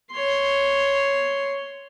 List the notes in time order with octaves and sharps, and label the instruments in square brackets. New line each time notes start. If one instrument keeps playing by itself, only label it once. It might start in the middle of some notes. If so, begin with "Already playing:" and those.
[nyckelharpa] C#5 C6